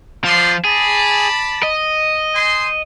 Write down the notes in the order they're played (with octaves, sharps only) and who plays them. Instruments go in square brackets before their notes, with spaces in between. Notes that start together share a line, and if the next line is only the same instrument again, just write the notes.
[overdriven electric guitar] F3 [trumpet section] B3 D5 C6
[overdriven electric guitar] G#4 [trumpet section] D5 A5 B5
[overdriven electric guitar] D#5
[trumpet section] C5 G#5 C6